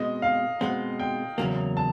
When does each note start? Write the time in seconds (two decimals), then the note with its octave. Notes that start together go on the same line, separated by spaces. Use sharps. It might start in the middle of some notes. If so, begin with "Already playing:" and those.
Already playing: B2 G#3 C4 D#5
0.22 F5
0.61 B2 G#3 C4 F#5
0.99 G5
1.38 E2 C#3 F#3 A#3
1.77 A5